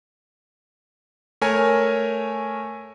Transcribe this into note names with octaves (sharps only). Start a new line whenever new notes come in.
A3 A#4 C#5 G#5